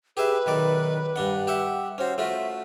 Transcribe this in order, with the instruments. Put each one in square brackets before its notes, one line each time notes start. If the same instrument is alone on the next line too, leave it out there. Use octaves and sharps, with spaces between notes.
[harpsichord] G4 G#4 E5 [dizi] B4
[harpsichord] B1 D#3 D5
G2 D4 F#5
G4 E5 F#5
[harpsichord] C#4 F#4 [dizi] C5
[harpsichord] A3 F4 F#4 [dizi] E5